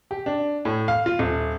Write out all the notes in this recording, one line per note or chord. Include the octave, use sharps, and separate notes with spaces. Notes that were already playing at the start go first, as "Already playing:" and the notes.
G4
D4
A2
F5
F4
D#1